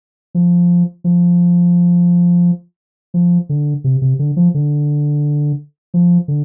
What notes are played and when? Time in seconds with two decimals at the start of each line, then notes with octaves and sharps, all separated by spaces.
0.35 F3
1.04 F3
3.14 F3
3.49 D3
3.84 C3
4.02 C3
4.19 D3
4.37 F3
4.54 D3
5.94 F3
6.28 D3